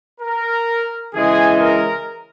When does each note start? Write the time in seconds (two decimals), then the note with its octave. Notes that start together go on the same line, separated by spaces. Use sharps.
0.20 A#4
1.14 C#3 E3 G#3 G#4
1.60 A#4